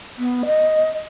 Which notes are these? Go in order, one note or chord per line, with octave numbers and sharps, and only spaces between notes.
B3
D#5